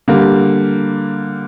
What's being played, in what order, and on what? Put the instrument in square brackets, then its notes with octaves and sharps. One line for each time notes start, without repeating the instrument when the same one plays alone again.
[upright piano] D3 G3 A#3